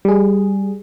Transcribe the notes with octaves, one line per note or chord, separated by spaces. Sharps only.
G3 G#4